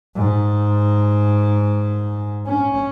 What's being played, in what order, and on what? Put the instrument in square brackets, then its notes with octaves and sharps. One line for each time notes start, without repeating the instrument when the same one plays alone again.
[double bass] G#2
C#4